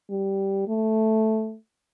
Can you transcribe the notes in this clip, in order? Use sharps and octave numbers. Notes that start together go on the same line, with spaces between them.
G3
A3